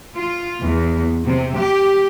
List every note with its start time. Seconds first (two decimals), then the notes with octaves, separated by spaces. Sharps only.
0.15 F4
0.63 E2
1.26 C3
1.58 G4